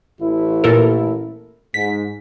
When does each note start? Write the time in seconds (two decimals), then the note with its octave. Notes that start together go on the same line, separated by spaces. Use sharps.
0.20 A1 E4
0.64 A#2 A4 A#4
1.74 G#2 B6